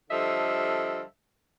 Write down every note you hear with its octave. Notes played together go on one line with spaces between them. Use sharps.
D3 F3 G3 A4 D#5 E5